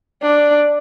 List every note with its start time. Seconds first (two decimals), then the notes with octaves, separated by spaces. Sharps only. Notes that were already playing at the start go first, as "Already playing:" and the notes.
0.23 D4